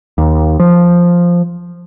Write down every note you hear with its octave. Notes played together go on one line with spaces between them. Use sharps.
D#2
F3